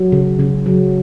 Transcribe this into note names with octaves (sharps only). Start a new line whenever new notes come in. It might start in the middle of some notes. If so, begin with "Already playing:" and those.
Already playing: F#3
C#3
C#3
F#3